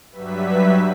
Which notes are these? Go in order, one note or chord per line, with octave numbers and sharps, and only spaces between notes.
G2 F#3 G3 B4 E5 B6